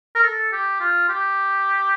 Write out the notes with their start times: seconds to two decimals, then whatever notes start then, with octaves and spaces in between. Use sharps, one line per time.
0.16 A#4
0.23 A4
0.52 G4
0.80 F4
1.09 G4